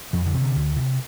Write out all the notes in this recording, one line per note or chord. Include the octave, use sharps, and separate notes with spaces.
F2 F3
D3
C3
D3
D2
C3